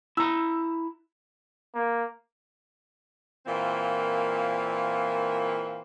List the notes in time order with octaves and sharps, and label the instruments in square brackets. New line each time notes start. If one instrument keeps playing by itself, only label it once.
[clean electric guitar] E4 A#5 [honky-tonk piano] E6
[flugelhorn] A#3
[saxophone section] A#2 E3 A#3 C4 F4